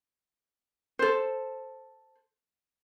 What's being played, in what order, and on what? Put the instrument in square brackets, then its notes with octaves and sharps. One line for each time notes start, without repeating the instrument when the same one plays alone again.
[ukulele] A4 C5